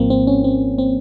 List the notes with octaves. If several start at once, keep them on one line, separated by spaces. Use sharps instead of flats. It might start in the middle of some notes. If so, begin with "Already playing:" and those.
Already playing: G#1 G#2 F3 A#3 C4
C4
C#4
C4
C4